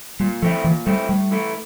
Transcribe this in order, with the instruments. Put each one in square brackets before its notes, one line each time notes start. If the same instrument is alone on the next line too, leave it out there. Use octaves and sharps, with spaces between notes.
[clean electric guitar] A#2 [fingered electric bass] G3
[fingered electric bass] F3 [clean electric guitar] A3 C4 E4
[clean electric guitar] A#2 [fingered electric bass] E3
[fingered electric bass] G3 [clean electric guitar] A3 C4 E4
[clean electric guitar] A2 [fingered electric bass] G3
[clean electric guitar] E3 A3 E4